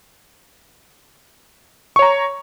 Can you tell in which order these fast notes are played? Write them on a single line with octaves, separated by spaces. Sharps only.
C#6 C#5 A#5